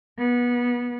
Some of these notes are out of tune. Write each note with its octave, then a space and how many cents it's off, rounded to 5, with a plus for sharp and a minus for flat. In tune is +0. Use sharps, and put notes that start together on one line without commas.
B3 -25